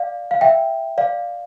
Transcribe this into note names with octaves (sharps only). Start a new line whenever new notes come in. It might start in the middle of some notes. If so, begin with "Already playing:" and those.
Already playing: D5 F5
F5
E5 G5
D5 F5